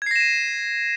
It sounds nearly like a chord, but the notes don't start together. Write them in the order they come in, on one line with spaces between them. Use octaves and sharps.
G#6 C7 A#6 E7 D#7